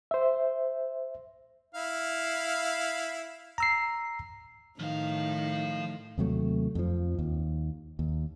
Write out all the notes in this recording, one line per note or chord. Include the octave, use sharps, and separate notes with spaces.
C5 E5
E4 F5
A#5 E6 C7
A2 D#3 F3 F5
D#2 C3 F#3 A3
F2 F3
D#2
D#2